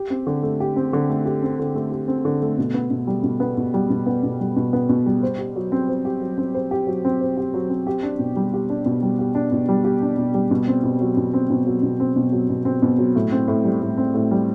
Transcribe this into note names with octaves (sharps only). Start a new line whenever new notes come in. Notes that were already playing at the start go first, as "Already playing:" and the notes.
Already playing: G4
C4
D3
A3
G4
C4
D3
A3
G4
C4
D3
A3
G4
C4
D3
A3
B2
B3
B2
G3
B2
B3
B2
G3
B2
B3
B2
G3
B2
B3
B2
G3
C5
G4
F#3
C4
C5
G4
F#3
C4
C5
G4
F#3
C4
C5
G4
F#3
C4
G4
D4
B2
G3
G4
D4
B2
G3
G4
D4
B2
G3
G4
D4
B2
G3
B2
C4
B2
F#3
B2
C4
B2
F#3
B2
C4
B2
F#3
B2
C4
B2
F#3
A2
C4
A2
G3
A2
C4
A2
G3